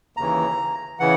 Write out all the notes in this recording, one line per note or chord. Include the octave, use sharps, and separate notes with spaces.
D#2 C#3 E3 A#5
C#3 E3 F#5